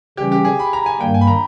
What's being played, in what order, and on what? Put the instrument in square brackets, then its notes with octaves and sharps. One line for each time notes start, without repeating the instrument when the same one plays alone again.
[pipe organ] C#3 E3 G3 C#4 [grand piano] G4
[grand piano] G4
G#4
B5
A#5
G#5
[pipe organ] G2 D#3 G3 A#3 [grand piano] G5
[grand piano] G#5
B5
A#5